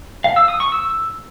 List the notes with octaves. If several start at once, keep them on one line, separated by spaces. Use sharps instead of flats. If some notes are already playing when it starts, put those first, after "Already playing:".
F5
E6
D#6
C#6
E6